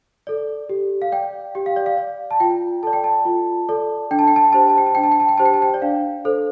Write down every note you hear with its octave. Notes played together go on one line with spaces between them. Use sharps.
A4 D5
G4
F5
D5 G5
G4 G5
F5
D5
F5
D5
A5
F4 G5
A4 D5 A5
G5
A5
F4
A4 D5
D4 G5
A5
G5
A5
G5
G4 C5 A5
G5
A5
G5
A5
D4 G5
A5
G5
A5
G5
G4 C5 A5
G5
A5
G5
D5
D4 F5
A4 C5